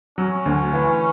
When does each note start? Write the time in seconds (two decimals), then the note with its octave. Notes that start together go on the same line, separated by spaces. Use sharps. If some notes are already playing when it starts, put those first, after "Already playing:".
0.18 F#3 C#4
0.46 D2
0.73 E3